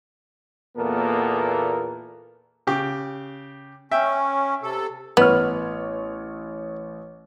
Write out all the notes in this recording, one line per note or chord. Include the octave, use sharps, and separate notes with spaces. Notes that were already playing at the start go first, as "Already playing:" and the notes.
E2 A#2 A#3 B3 A4 A#4
C#3 G4
C#4 E5 G5
C3 A4
A1 B3 C#5 F6